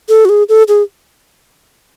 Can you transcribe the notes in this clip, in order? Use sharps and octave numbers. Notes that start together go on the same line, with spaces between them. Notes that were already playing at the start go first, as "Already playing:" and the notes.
A4
F#4
G#4
A4
G#4